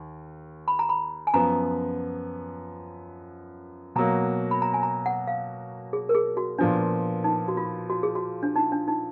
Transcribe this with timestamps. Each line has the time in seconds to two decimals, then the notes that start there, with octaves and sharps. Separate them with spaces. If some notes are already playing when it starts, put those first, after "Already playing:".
Already playing: D#2
0.68 B5
0.79 A#5
0.89 B5
1.27 G#5
1.33 F#2 F3 B3 A#5
3.95 B2 F#3 A#3 A#5
4.51 B5
4.62 A#5
4.74 G#5
4.83 A#5
5.06 F#5
5.27 F5
5.93 G#4
6.09 A#4
6.15 G#4
6.37 F#4
6.58 A#2 F3 B3 D4
7.24 D#4
7.48 F#4
7.57 F4
7.90 F#4
8.03 G#4
8.15 F#4
8.43 D4
8.56 D#4
8.72 D4
8.88 D#4